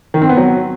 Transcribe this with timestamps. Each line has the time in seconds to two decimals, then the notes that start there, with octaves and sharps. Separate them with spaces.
0.14 D#3
0.22 C4
0.29 B3
0.37 F#3